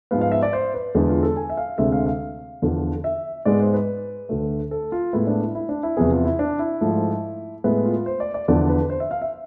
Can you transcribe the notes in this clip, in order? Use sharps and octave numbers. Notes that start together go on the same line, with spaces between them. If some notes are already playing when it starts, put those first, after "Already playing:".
G#2 F3 G#3 B3 F5
F5
E5
D5
C5
B4
E2 D3 G#3 B3
F4
A4
G#5
E5
F5
D2 C3 G#3 E5
F5
F5
E2 D3 F3
E5
G#2 G#3 B3 D5
C5
B4
D2 D3 A3
A4
F4
A2 G#3 B3 E4
D4
E4
E4
D4
E4
E2 C3 F3 B3 G#4
F4
E4
D4
E4
G#2 F3 A3
A2 G#3 B3 E4
F4
C5
D5
D5
E2 D3 F3 D5
B4
C5
E5
F5
E5